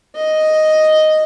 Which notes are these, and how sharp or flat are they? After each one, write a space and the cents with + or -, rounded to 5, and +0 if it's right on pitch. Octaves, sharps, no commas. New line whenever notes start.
D#5 +0